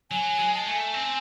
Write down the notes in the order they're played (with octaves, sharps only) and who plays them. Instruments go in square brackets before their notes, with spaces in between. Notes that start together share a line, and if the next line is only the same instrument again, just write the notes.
[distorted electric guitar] F#3 [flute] G#5
[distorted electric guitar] G#3
[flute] A5
[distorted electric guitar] A3 [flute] G#5
[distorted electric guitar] C4